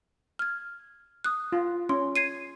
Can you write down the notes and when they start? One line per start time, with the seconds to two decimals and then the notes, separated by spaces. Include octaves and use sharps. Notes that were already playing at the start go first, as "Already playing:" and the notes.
0.39 F6 G#6
1.24 D#6 F#6
1.52 F4
1.89 C#4 C6
2.16 G#6 C7 D#7